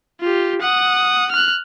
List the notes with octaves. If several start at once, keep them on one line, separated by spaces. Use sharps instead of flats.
F4 G4
F#5 D#6
F6 F#6